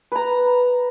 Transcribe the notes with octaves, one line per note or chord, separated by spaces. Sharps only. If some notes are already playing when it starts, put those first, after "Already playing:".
B4 A#5